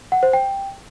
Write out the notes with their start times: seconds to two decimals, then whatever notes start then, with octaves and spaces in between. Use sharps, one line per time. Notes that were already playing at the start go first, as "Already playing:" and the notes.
0.12 F#5
0.23 C5
0.33 G5